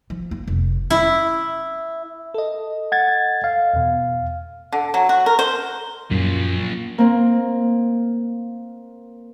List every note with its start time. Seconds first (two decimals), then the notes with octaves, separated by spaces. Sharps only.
0.10 F3
0.31 A#3
0.48 F1
0.90 E4
2.34 A4 D#5
2.92 F#5 G#6 A6
3.44 F5
3.73 E2 B2
4.72 D3
4.94 F#3
5.09 F#4
5.26 A#4
5.39 C5
6.11 F#2 A#2 F3
6.98 A#3 C4